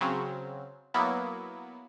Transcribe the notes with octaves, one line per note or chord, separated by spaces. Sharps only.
C#3 F#3 C4
F#3 A#3 B3 E4